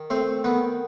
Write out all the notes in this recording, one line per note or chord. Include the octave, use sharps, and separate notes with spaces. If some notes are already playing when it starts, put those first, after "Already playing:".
Already playing: D#3
A3 C4 C5
D#3 B3 B4